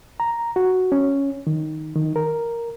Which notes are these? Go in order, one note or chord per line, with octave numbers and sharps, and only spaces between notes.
A#5
F#4
C#4
D#3
D#3
A#4